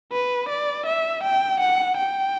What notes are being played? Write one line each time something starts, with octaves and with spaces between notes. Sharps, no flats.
B4
D5
E5
G5
F#5
G5